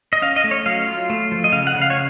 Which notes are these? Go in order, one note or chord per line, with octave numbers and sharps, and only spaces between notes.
D#5
C#4 F5
D#5
A3
C#5
F#3 F5
F4
A3
F3
D#5
C#3 F5
F#5
C#3
F5
C#5